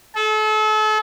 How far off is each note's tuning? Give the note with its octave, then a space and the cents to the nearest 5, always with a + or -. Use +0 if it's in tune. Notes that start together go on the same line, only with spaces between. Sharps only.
A4 -35